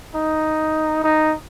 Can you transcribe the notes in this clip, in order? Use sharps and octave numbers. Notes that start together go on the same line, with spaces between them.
D#4
D#4